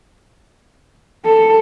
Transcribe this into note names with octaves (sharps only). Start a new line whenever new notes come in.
A4